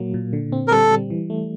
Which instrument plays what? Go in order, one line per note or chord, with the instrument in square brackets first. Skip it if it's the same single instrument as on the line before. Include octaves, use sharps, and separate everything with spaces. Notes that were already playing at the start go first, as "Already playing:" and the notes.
Already playing: [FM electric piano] A#2 F#3 A#3
A#2
D3
C4
[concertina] A#4
[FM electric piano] G3 [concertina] A4
[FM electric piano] G3
E3
A3